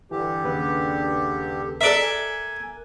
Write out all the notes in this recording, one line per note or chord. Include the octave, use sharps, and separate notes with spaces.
G2 D3 E3 G4
D#2 C#3 B4
A4 A#4 D5 E5 F#6
G#5